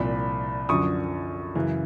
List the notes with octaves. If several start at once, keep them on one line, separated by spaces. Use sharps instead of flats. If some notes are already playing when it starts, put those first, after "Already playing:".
Already playing: C2 A#2 F3 B5
F#2 D3 F3 C#6 D#6
F#2 C#3 E3